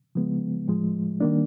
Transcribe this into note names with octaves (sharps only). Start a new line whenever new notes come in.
C#3 F3 G#3 B3
A2 F3 G#3
D#3 G3 A#3 D4